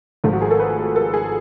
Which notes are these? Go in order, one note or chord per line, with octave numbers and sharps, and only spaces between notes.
G#1 G#2 F3 A3 F4
F#4
G#4
A4
B4
A4
G#4